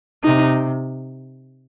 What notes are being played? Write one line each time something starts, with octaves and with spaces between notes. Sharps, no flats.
C3 D#4